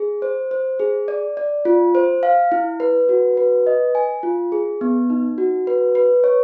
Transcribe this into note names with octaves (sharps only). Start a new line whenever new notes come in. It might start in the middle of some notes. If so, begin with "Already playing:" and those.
Already playing: G#4
C5
C5
G#4
D5
D5
F4
C5
F5
E4
B4
F#4
B4
D#5
G#5
F4
G#4
B3
D#4
F#4
B4
B4
C#5